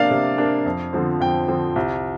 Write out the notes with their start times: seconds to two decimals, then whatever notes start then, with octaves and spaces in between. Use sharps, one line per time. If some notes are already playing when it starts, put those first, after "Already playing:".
Already playing: C3 A#3 D4 D5 F5
0.10 C3
0.38 A#3 D4
0.66 F2
0.93 D3 F3 C4
1.20 F2 G5
1.48 D3 F3 C4
1.76 C2